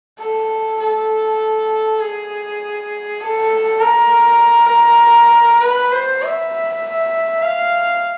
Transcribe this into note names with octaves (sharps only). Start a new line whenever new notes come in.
A4
A4
G#4
A4
A#4
B4
C5
E5
F5